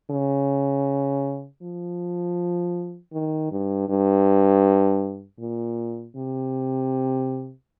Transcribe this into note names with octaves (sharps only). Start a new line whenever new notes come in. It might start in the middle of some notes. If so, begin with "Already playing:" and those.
C#3
F3
D#3
G2
G2
A#2
C3